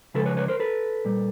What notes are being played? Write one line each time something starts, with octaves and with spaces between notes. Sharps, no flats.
C#3 F3 G#3 A4 B4
B4 C#5
B4 C#5
A#4 C5
A4 B4
A#2 G3